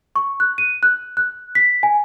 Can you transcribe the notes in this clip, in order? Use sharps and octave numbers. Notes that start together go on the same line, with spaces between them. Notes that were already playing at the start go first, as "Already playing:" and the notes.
C#6
F#6
D#7
F#6
F#6
B6
G#5